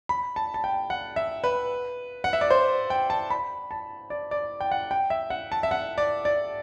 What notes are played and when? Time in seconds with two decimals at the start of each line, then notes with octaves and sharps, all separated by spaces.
0.09 B5
0.36 A5
0.54 A5
0.64 G5
0.90 F#5
1.16 E5
1.44 B4
2.24 F#5
2.33 E5
2.41 D5
2.50 C5
2.90 G5
3.10 A5
3.30 B5
3.71 A5
4.10 D5
4.31 D5
4.61 G5
4.71 F#5
4.91 G5
5.10 E5
5.30 F#5
5.52 A5
5.63 E5
5.71 F#5
5.98 D5
6.25 D5